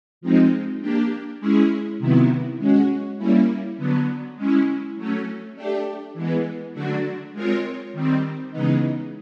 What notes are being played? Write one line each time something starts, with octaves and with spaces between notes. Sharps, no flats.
F3 G#3 C4 D#4
A#3 D4 G4
G#3 C#4 E4 G#4
C3 D#3 F#3 B3 E4
G#3 C#4 F#4
G3 A#3 C#4 E4
D3 F#3 B3
G#3 C#4 E4
F#3 A3 C#4
A3 D4 G4
E3 G#3 B3
D3 F#3 A3 D4 F#4
G#3 C4 F4 A#4 C#5
D#3 G3 C4
C#3 E3 G#3 B3 D#4